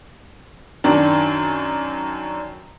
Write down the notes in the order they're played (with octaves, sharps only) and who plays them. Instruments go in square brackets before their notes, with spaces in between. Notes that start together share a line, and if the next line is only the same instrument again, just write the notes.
[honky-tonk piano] F#2 D#3 D4